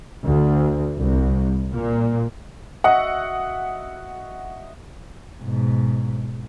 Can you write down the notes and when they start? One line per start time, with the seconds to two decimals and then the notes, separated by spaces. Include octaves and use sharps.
0.25 D2
0.97 C2
1.72 A#2
2.84 F#4 D#5 E5 F#5
5.42 G#2 B2